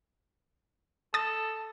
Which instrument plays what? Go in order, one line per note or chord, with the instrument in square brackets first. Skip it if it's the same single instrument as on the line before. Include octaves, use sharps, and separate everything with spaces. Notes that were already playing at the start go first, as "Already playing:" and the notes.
[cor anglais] A4 [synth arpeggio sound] D#6 A6